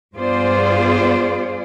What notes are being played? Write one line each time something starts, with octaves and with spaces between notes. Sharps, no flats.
G2 B3 F4 G#4 C5 D5